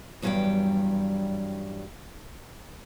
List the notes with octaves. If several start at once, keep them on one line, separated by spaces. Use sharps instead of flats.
E2 G2 F#3 G3 F5 G5